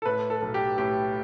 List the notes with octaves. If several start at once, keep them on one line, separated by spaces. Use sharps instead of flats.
A4
A2 B4
A4
B1
G4
A2 G4